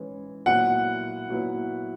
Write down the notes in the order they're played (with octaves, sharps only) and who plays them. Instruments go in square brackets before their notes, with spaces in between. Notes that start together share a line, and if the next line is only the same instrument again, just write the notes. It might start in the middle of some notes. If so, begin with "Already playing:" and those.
Already playing: [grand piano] E3 G#3 C#4
[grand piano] A#2 F#3 B3 E4 [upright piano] F#5
[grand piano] A#2 F#3 B3 E4